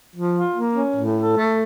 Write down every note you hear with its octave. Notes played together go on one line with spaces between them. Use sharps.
F3
F4
A#3
C#4
A2
A4
A3